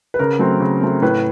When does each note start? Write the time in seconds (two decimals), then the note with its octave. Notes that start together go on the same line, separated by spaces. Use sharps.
0.14 B4
0.19 C#3 A#4
0.39 F#3 A3 C4
0.60 C#3
0.81 F#3 A3 C4
1.02 A2 B4